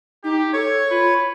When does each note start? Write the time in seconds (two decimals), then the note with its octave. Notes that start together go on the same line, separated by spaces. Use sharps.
0.24 D#4 G4
0.53 A4 C#5 G#6
0.90 F4 B4